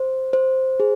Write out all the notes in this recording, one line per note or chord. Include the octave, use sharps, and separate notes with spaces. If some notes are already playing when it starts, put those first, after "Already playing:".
Already playing: C5
C5
G#4